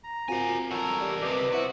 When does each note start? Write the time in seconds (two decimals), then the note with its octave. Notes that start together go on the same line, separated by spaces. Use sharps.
0.04 A#5
0.28 C4 F4 F#4 A#4 G#5
0.71 E2 A4 A#4 C#5
1.01 G4 D5
1.22 C2 C3 B4 D#5 D6
1.53 E4 F#4 C5 E5